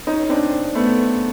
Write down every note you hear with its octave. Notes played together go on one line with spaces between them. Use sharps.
C#4 D#4
C4 D4
A3 B3